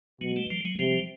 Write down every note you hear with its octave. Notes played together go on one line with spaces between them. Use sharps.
B2 F#3 G#3
G3 A3
F3 G3
F#3 G#3
C3 F3 G3